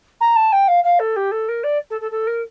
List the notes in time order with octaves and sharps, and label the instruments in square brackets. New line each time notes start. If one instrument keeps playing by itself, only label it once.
[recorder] A#5
A5
G5
F5
F5
A4
G4
A4
A#4
D5
A4
A4
A4
A#4